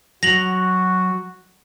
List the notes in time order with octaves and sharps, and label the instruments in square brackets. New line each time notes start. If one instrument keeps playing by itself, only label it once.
[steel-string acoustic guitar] F#3 [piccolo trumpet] F#4 [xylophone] A#6 F7 F#7